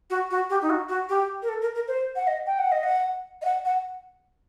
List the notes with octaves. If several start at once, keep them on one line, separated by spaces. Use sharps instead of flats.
F#4
F#4
G4
D#4
F#4
F#4
G4
A#4
A4
A#4
A#4
C5
F#5
D#5
G5
F#5
D#5
F#5
D#5
F#5
F#5